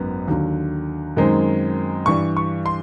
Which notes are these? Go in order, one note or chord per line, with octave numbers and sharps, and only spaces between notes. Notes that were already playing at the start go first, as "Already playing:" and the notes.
Already playing: G#1 F#2 D#3 B3
D#2 D3 F#3
F#2 D#3 G#3 C4 D#4
G2 E3 G3 C#6
C#6
C6